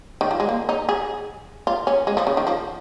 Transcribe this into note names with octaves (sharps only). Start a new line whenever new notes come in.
D#3
F3
G#3
A#3
D#4
G#4
F4
C#4
G#3
F3
C#3
D#3
F3